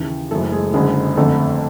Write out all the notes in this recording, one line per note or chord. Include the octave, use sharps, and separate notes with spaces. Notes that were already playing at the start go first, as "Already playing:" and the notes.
Already playing: D#2 C#3 E3
F#1 F#2 C#3 E3 A3 A4
G#3 G#4
F#1 F#2 D3 G#3 G#4
G1 F2 D3 A3 A4